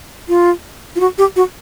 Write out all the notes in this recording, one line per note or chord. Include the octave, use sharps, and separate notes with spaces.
F4
F4
F#4
G4
F#4